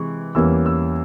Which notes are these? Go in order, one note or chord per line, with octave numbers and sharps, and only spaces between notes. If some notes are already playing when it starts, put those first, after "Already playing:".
Already playing: C3 E3 G#3 C#6
E2 E3 G3 A#3 C#4 E6
E6